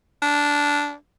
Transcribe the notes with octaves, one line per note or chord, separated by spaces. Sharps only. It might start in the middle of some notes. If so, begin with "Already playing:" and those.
D4